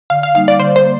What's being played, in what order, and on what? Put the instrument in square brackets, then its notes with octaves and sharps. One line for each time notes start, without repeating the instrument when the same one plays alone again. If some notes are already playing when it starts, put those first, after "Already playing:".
[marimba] D3 [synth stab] F5
[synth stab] F5
[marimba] G3 A#3 D#4 [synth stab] F5
[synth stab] D5
[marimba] D3 [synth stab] C5
[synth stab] C5
[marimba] G3 A#3